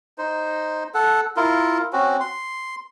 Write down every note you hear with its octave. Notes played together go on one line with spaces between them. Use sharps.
D#4 C5
A4 F#5
E4 F4 A#4
C4 C#4 F#4
C6